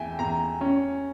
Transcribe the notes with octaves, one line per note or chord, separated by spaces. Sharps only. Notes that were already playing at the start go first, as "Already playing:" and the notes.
Already playing: E2 E5 G5 G#5
E2 A#5
C#4